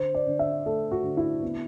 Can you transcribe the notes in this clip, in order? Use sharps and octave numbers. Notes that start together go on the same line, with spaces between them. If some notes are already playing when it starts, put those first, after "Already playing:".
Already playing: D3 C5
D5
D3
E5
A3 A4
F#4
D3
E4
B3